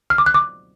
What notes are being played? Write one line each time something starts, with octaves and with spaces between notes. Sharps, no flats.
F6
D6
F#6
D6